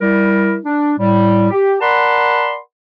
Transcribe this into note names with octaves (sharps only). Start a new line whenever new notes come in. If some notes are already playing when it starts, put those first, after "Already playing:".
G3 E4 A#4
D4
A2 G3
G4
A#4 D5 F#5 A5 B5 C6